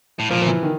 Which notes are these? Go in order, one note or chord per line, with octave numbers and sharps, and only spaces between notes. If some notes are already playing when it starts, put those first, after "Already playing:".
A2
A#2 F3
F3
E3
D#3